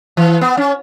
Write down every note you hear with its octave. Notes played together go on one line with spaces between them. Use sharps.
E3
B3
C#4